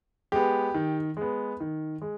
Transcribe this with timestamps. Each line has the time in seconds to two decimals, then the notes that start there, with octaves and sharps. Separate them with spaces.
0.32 G#3 B3 G4
0.74 D#3
1.17 G#3 B3
1.60 D#3
2.02 G#3